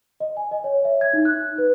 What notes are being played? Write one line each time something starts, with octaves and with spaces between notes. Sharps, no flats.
D#5
G#5
D#5
C#5
E5
G#6
D#4
F#6
B4